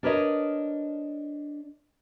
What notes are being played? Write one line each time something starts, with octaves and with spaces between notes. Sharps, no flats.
D4 A#4 B4 C#5 D#5